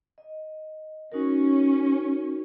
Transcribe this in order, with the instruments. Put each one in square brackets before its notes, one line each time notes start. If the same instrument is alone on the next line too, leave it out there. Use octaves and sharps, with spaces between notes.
[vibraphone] D#5
[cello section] C#4 [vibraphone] D#4 F#4 A#4